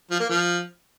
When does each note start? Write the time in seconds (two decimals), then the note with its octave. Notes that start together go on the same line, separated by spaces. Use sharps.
0.11 F3
0.20 A#3
0.29 F3